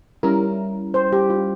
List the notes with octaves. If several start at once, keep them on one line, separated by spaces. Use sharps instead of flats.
G3 C#4 E4 A#4
C5
G4
F4